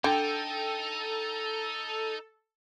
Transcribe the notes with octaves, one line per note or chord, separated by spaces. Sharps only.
D3 D#4 A4 G5